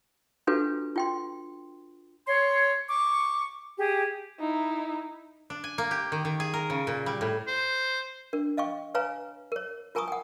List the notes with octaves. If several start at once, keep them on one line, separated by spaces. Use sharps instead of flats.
D4 F4 F#4 A4 B4
F4 G5 C6
C#5 C6
C#6 D6
G4 G#4
D#4 E4
D4
G#5
A#3
G4
D#3
D#3
G#4
A#4
C#3
A#2
G3
A2
C5
D4 A#4
D#5 F5 G5 C#6
B4 C#5 F5 G#5 A#5
A#4 C#5
F4 A#4 G#5 A#5 C#6 D#6
F#5 G5